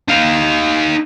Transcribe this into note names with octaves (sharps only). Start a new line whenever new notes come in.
D#4 F5